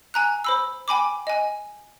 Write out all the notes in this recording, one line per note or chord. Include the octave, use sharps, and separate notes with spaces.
G#5 A#5 F#6
C5 B5 E6
G5 G#5 B5 D6
D#5 G#5